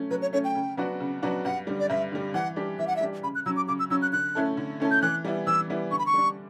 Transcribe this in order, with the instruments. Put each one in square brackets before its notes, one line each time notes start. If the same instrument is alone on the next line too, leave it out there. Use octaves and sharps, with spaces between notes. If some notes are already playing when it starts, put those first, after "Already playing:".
Already playing: [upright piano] F#3 A3 C#4
[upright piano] F#3 [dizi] B4
[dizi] C#5
[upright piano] A3 C#4 [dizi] C#5
[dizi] G5
[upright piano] C#3
F#3 B3 D4 F#4
C#3
F#3 B3 D4 F#4
[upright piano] G2 [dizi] F#5
[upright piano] D3 G3
[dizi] D5
[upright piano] G2 [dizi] E5
[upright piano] D3 G3
[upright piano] E3 [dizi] F#5
[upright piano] G3 D4 G4
[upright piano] E3 [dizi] E5
[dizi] F#5
E5
[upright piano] G3 D4 G4
[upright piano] C#3 [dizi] B5
[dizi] F#6
[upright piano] F#3 [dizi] E6
[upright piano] C#4
[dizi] D6
[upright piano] C#3 [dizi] D6
[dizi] E6
[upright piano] F#3 C#4 [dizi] E6
[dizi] F#6
[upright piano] D3 [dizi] F#6
[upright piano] A3 C#4 E4 A4
D3
A3 C#4 E4 A4
[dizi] G6
[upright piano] E3 [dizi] F#6
[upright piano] G3 B3 E4
[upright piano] E3 [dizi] E6
[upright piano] G3 B3 E4
[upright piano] D3 [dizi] C#6
[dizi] B5
C#6
[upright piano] G3 D4